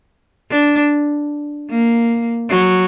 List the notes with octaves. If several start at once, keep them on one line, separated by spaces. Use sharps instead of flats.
D4
A#3
F#3